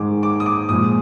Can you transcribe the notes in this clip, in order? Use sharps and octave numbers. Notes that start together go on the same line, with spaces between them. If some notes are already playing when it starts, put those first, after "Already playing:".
Already playing: G#2 D#3 G#3 D6
D6
D#6
D6
A#2 F3 G#3 D#6